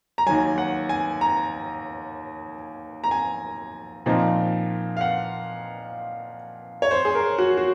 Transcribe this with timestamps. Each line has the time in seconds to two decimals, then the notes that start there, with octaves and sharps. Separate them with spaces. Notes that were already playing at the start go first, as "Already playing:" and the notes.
0.18 A#5
0.26 D#2 D#3 F#3 G#5
0.58 F#5
0.89 G#5
1.21 A#5
3.04 A#5
3.11 G#5
4.06 A#2 F3 C4 D#4
4.97 F5
5.01 F#5
6.82 C#5
6.91 C5
7.05 G#4
7.15 A#4
7.38 F#4
7.58 F#4